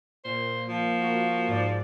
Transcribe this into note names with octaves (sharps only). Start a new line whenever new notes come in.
A#2 C5
F3
A#3 F#4
G#2 D5